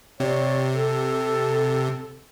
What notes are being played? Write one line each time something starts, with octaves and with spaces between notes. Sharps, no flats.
C3 C#5 D5
A4